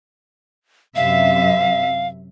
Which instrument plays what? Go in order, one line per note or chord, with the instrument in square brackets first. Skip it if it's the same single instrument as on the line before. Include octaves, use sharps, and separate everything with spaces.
[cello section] F#2 C3 E5 [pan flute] F5